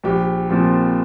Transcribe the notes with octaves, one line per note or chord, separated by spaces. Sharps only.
A#1 G4
A#2 F3 C4